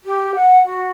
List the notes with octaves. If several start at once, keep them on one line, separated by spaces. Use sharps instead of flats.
G4
F#5
F#4